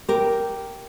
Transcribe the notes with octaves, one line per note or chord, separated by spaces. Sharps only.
G4 A#4